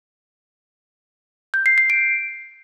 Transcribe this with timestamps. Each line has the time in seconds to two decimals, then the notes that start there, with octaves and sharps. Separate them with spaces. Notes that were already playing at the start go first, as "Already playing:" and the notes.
1.54 G6
1.66 C7
1.78 C7
1.90 D7